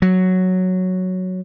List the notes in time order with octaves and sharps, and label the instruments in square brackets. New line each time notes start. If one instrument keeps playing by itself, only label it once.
[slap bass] F#3